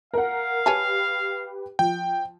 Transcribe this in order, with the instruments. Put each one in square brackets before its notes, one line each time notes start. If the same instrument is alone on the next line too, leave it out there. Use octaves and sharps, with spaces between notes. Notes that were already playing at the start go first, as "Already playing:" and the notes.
[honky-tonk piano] A#4 F#5 [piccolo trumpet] F5
[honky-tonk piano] G4 B4 [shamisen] C#5 G#5 A5
[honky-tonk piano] F3 [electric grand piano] G5